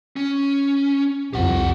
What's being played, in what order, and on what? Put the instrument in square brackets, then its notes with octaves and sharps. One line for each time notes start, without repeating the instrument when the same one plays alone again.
[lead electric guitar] C#4
[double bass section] C2 F2 [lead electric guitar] G4 F#5